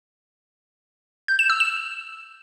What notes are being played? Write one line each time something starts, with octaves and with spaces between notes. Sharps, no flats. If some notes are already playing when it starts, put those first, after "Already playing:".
G6
E7
E6
E7